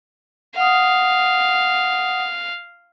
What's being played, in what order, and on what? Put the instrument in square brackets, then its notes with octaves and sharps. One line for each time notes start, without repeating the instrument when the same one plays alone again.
[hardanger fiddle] F5 [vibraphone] F#5 D#6